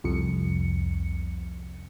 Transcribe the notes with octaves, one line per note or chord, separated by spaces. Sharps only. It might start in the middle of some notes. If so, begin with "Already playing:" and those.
C2 F2 C#7